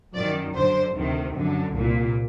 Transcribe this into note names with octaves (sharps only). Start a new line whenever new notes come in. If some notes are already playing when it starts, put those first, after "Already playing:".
F#2 D#3 D5
F#2 D3 C5
D2 C3 D#3
F#2 D3
C2 A#2